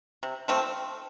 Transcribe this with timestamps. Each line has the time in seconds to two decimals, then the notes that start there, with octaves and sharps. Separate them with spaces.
0.23 C3
0.48 F3 A3 C4